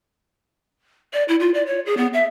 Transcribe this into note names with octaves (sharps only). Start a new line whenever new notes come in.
D5
E4
F4
D5
C#5
G#4
B3
E5